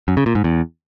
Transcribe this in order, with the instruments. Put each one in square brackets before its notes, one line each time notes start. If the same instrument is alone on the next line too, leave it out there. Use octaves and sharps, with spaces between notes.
[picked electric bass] F#2
C#3
A#2
G#2
E2